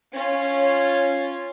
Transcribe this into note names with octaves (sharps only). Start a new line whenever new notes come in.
C#4 F4